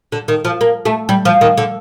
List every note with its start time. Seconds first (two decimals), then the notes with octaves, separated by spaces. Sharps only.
0.12 D3
0.28 D#3
0.45 F3
0.61 A#3
0.85 A3
1.09 G3
1.25 F3
1.41 D#3
1.58 D3